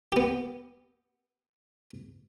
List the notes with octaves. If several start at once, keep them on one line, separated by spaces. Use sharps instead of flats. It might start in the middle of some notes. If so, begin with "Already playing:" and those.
B3 G4